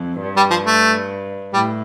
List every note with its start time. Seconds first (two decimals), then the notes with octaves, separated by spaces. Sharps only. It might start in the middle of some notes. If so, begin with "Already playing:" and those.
Already playing: F2
0.21 G2
0.37 G3
0.50 F3
0.66 A3
1.53 A2 G3